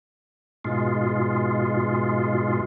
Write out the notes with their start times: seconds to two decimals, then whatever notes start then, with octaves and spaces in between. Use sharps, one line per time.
0.65 G#2 B2 G#3 F4